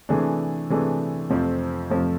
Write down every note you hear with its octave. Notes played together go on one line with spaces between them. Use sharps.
C3 E3 A3 D4 G#4
C3 E3 A3 D4 G#4
F2 C3 F3 A3 C4
F2 C3 F3 A3 C4